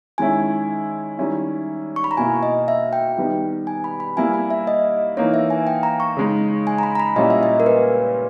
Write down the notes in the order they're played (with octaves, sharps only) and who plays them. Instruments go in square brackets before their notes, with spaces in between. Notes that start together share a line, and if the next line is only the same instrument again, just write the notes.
[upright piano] D#3 G#3 C#4 E4 [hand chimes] G#5
[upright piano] D#3 G3 C#4 E4
[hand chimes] C#6
B5
A#5
[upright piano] B2 A#3 E4 [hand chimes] G#5
[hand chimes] D#5
E5
G5
[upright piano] D#3 G3 B3 D#4
[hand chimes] G#5
B5
B5
[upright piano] G3 A#3 E4 [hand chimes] G#5
[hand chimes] B5
E5
D#5
[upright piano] E3 A#3 D#4 [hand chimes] C#5
[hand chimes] E5
G#5
G5
A#5
C#6
[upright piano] C#3 G#3 D#4
[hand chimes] G#5
A#5
B5
A#5
B5
[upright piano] A#2 G3 A#3 C#4 E4 [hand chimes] D#5
[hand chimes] E5
D#5
A#4
B4